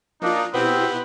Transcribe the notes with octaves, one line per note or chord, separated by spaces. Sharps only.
F3 A#3 D4 D#4 F4
B2 B3 C4 E4 G4